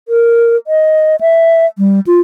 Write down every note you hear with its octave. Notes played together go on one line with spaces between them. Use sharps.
A#4
D#5
E5
G3
F4